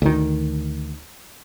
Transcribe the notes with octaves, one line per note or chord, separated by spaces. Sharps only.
D2 D#3